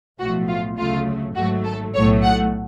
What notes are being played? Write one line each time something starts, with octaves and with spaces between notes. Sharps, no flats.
B1 A2 F3 A3 F#4
F4
D2 C#3 F#3 A3 F4
G#1 G#2 F#3 A3 F#4
A4
B1 A2 F#3 A3 C#5
F#5